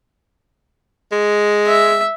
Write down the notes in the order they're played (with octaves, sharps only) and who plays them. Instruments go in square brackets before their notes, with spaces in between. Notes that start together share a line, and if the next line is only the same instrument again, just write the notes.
[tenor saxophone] G#3
[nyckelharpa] E5